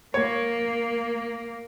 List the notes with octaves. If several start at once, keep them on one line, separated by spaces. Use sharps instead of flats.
A#3 C#5